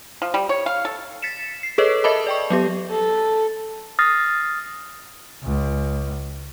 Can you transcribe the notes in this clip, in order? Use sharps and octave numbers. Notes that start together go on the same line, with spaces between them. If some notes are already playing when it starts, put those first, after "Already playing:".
F3
G3
C#5
F5
A4
A6 B6 C#7 E7
C7
G#4 A4 B4 C#5 D#5
A#4 D#5 E5 A5 B5 D6
D5 G5 C#6
F#3 B3 G4
A4
D#6 F6 A6 A#6 C7
C#2